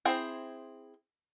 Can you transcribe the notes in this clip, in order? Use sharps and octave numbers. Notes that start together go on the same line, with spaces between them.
C4 E4 G#4 C5